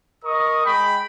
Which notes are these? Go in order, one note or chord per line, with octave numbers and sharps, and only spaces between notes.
A#4 D#5 C#6 D#6
G#3 G5 B5